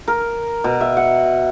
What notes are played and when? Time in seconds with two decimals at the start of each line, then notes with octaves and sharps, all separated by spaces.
0.08 A#4
0.64 B2
0.81 E5
0.97 F#5